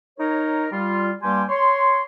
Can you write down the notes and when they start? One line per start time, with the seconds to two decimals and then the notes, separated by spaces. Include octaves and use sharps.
0.19 D#4 A#4 C#5
0.72 G3 F4
1.22 G2 G3 A#3 G4 G#5 C6
1.49 C#5 C6